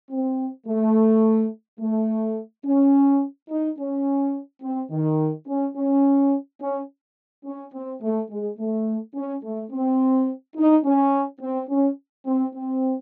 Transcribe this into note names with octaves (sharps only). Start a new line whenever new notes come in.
C4
A3
A3
C#4
D#4
C#4
C4
D#3
C#4
C#4
C#4
C#4
C4
A3
G#3
A3
C#4
A3
C4
D#4
C#4
C4
C#4
C4
C4